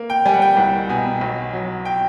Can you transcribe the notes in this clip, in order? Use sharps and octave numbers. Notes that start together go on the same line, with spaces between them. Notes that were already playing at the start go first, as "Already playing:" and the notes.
Already playing: A#3
G5
G3 G#5
F#5
G5
C2 F#5
B2 G#5
B1
F#3
G5